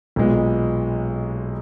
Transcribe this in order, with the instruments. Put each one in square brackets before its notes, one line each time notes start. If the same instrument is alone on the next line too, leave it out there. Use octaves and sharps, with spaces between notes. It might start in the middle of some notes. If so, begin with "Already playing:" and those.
[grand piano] B1 A#2 G#3 B3